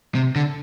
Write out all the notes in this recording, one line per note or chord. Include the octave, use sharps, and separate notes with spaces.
C3
D3